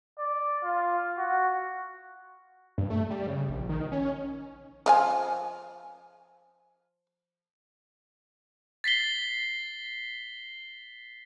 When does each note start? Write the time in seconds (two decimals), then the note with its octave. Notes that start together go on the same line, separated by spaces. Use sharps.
0.18 D5
0.63 F4
1.17 F#4
2.78 G2
2.90 A3
3.10 G3
3.27 C#3
3.49 A#1
3.69 D#3
3.92 C#4
4.86 F3 F5 G#5
8.84 A6 B6 C7 G7